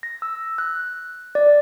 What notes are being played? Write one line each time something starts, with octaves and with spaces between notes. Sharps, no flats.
A#6
E6
F#6
D5